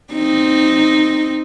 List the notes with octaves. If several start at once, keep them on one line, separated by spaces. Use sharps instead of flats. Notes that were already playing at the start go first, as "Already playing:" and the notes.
C4 D#4